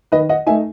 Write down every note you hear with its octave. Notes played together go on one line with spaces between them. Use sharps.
D#3 B4 D#5
D#5 F#5
A3 D#4 E5 G#5